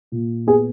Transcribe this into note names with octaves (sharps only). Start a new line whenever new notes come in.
A#2
B3 G#4